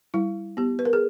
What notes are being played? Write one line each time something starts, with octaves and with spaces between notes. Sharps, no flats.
G3 E4
B3 G4
B4
A#4
G#4